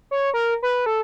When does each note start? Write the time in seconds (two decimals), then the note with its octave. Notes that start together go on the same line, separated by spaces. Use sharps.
0.11 C#5
0.34 A#4
0.63 B4
0.86 A4